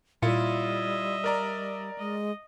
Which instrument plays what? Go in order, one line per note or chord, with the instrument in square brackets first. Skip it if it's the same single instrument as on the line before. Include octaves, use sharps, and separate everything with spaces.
[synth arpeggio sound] A#2 [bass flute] G3 [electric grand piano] E4 F4 C#7 [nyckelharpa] D#5 E5
[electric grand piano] A#4 D5 A#5
[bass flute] G#3 [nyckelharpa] D#5